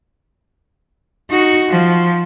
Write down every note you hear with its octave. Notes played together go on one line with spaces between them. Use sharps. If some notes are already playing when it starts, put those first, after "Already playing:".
D#4 F#4
F3